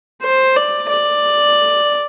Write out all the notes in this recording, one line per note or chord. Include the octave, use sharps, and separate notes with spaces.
C5
D5
D5